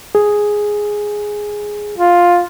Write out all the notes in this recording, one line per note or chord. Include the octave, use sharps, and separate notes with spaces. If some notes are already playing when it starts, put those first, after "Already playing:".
G#4
F4